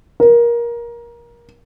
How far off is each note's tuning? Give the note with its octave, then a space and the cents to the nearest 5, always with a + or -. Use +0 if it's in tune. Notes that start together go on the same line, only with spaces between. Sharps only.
A#4 +20